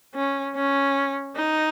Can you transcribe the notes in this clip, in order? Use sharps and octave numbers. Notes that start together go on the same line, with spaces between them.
C#4
C#4
D#4